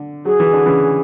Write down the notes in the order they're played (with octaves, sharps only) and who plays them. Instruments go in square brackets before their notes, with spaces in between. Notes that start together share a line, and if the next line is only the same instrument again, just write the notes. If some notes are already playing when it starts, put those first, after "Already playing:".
Already playing: [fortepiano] D3
[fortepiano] F#3 [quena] G#4
[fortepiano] E3
D3
C#3 E3